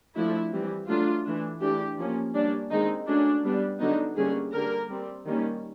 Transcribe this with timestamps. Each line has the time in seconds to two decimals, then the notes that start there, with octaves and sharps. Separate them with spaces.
0.15 F3 A3 D4 E4
0.52 E3 G3 C4
0.88 F#3 A3 D4 F4
1.25 E3 A3 D4
1.61 E3 A3 D4 G4
1.98 F3 A#3 C#4
2.34 G3 A#3 C#4 D4
2.71 D#3 G#3 C4 D#4
3.07 F#3 A3 C#4 D4
3.44 G3 B3 D4
3.80 D3 F#3 B3 D4 D#4
4.17 D3 G3 A#3 C#4 G#4
4.53 D3 G3 A#3 A#4
4.90 G3 C4
5.26 D#3 G3 A#3 C#4